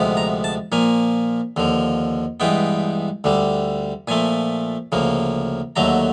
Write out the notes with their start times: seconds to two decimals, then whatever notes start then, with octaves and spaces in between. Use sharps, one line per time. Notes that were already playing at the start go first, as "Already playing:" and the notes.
Already playing: D2 C3 F3 G#3 B3
0.17 A#5
0.44 A5
0.72 A#2 F3 A#3 G#5
1.57 D#2 D3 F3
2.40 G2 E3 G#3 B3 G5
3.24 D2 D3 G3
4.08 A#2 F3 A3 G#5
4.92 D2 C#3 F3 A#3
5.76 D#2 D3 F#3 A3 A#5